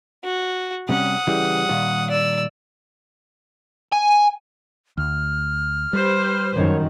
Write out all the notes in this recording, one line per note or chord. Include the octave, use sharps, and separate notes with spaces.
F#4
C3 G3 C#4 F#5 D#6
C#3 E3 G3
A#2 D#3 G3
D5 E6
G#5
D2 F6
G3 G4 B4 C5
F#2 D#3 C#5